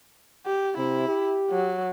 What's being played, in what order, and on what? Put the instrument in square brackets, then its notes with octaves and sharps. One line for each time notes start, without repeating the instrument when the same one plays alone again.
[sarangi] G4
[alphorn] C3 [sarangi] E4
[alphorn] G4
[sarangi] F#3